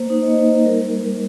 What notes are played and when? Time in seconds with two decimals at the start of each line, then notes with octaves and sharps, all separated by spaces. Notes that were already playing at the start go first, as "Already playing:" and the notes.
Already playing: A#3 C5
0.10 D#4
0.22 D#5
0.28 A#3 C5
0.47 D#4
0.65 G3 A#4